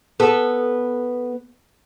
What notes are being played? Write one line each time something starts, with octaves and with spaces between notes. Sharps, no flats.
B3 A4